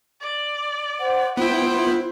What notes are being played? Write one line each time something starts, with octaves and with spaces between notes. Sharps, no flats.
D5
C5 F#5
B3 E4 F4 C5 G5